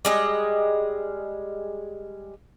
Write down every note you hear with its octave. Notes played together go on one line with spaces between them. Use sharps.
G3 G#3 D#5